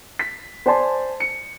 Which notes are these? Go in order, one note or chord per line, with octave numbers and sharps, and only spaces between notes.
B6
C5 D5 G#5 A5 C6
C#7